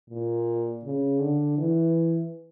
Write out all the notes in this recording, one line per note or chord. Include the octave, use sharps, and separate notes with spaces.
A#2
C#3
D3
E3